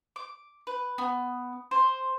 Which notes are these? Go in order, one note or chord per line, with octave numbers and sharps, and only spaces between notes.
D6
B4
B3
C5